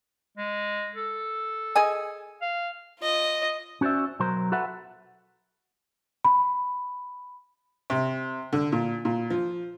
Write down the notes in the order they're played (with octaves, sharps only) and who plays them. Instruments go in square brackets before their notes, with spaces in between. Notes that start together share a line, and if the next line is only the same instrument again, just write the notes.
[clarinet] G#3
A4
[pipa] G#4 D#5 G#5
[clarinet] F5
[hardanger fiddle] F4 D#5
[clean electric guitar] C#4 F#4 C5 D5 E5
B1 F#3 A#4 C5
F#4 A4 B4 E5 F#5
[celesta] B5
[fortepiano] C3
D3
A#2
A#2
F3